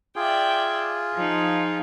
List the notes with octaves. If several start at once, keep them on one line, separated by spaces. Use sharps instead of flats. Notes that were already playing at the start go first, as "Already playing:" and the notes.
F4 G#4 D5 E5 G5
F3 D#4